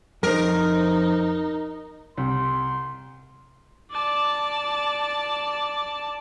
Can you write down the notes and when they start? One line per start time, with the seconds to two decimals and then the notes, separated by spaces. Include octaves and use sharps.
0.23 F2 D#4 A#4 C5
2.18 C2 C6
3.91 D5 A5